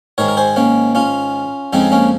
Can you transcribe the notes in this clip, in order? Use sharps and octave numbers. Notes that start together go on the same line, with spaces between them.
G#2 D#3 G#3 A#4 C#5
A#4
G#4 C5
A#3 C#4
C#4 F4
F2 C#3 F3 G#3 C4 D#4
A#3 C#4